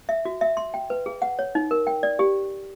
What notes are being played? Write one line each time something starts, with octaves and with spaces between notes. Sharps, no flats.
E5
F#4
E5
C6
G5
B4
G#4
F#5
C#5
D#4
A#4
G5
D5
G4